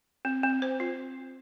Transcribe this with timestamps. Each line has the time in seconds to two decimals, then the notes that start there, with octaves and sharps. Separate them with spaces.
0.25 C4
0.43 C4
0.62 C5
0.80 F4